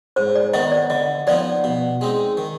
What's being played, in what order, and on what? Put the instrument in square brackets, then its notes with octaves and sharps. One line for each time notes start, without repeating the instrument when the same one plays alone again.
[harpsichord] G#2 [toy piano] C5
[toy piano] D5
[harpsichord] D#3 B3 D#4 [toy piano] D#5
[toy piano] D5
[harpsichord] D3 [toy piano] D#5
[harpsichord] F3 B3 D#4 [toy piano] D5
[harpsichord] B2
G#3 C4 D#4
D#3